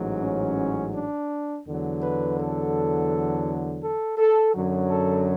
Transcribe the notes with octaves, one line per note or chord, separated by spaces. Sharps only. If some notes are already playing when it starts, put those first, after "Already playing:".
Already playing: A1 G#2 F#3
C#4
D4
E2 D3 F#3
B4
A4
A4
A4
F#2 D3 F#3
A4